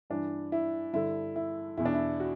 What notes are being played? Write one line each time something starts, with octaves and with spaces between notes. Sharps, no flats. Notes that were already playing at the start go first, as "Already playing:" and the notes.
G2 E3 D4
E4
G2 D3 E4
E4
E2 B2 E4
D4
E4
F#4